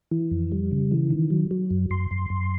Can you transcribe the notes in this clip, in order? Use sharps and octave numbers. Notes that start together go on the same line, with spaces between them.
E3
F2
G3
C#3
E3
D#3
F#3
F#3
F#2
F#2 C6
F#2
F#2